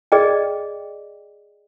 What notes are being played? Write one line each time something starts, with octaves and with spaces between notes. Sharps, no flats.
G#4 D5 D#5 G5